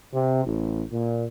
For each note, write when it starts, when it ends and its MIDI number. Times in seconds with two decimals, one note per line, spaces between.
0.13 0.43 48
0.45 0.82 33
0.92 1.24 46